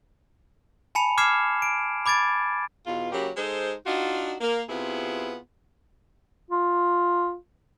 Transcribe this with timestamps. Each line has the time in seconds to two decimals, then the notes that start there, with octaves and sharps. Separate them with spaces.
0.95 G#5 A5 B5 C#7 F7
1.18 D6 F6 G#6 C7 E7
1.62 D7
2.06 B5 D6 G#6 A6 D7
2.87 E2 B2 F4
3.12 C#3 F#3 A#3 G4
3.37 G#3 D#4 A4 C5
3.86 D4 D#4 F4 F#4
4.40 A#3
4.69 C3 B3 E4 F4 G#4
6.51 F4